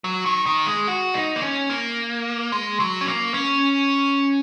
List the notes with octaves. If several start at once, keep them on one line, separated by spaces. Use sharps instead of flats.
F#3
D#3
D#3
G#3
F#4
D#4
A#3
C#4
A#3
G#3
F#3
C#4
A#3
C#4